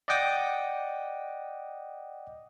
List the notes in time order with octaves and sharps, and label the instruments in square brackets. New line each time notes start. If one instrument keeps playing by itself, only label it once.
[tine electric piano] D5 D#5 F#5 G5 D6 D#6